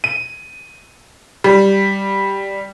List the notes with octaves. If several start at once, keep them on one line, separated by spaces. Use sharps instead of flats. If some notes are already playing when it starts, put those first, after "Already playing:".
D#7
G3